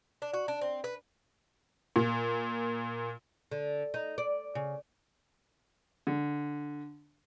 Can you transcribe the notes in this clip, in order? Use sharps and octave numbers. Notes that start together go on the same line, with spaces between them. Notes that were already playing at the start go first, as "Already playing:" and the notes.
D4
F#4
D4
C4
B4
A#2
D3
D#4
D5
C#3
D3